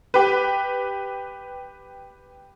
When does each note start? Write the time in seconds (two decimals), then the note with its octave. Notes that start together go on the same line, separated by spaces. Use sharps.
0.14 G4 B4